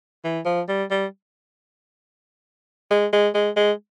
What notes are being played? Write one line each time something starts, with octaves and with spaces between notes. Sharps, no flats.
E3
F3
G3
G3
G#3
G#3
G#3
G#3